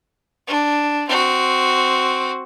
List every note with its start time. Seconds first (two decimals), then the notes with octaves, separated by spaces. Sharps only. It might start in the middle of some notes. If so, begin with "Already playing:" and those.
0.48 D4
1.08 C4 F#4